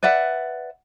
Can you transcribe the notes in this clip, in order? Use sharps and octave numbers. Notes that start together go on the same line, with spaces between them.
B4 D5 E5 F#5